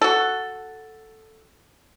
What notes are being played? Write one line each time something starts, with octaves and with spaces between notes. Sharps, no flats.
F#4 A4